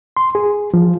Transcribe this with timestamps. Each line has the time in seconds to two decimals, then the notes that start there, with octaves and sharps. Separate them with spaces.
0.17 C6
0.35 G#4
0.74 F3